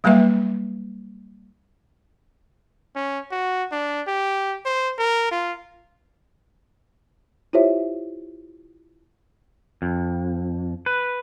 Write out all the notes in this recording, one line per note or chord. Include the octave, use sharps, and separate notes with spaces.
F#3 G3 A#3 B4 E5
C#4
F#4
D4
G4
C5
A#4
F4
E4 F4 G4 C5 C#5 E5
F2
B4